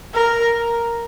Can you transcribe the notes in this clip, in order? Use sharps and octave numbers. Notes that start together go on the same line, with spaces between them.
A#4